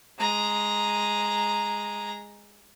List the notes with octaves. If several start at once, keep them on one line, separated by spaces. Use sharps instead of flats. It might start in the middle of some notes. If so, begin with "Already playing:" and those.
G#3 A#5